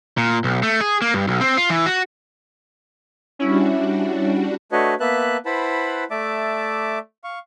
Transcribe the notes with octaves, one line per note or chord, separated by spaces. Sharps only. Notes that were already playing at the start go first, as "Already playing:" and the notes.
A#2
B1
A3
G#4
A#3
G2
B1
C4
F4
E3
F#4
G3 C#4 D4 E4 F#4
A3 D4 F#4 B4 C#5 D#5
A#3 B3 B4 E5 A5 F#6
E4 B4 C5 F#5 A5 B5
A3 D5 E5 A5 D6
F5 C#6